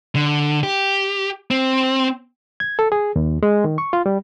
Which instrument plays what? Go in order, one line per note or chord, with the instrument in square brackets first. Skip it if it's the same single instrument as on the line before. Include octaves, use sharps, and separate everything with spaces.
[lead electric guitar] D3
G4
C4
[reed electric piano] G#6
A4
G#4
D#2
G#3
D#3
C#6
F4
G3